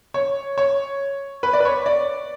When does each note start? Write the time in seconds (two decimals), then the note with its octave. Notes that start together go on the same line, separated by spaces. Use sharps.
0.14 C#5
0.58 C#5
1.43 B4
1.53 D5
1.60 B4
1.65 C#5
1.86 D5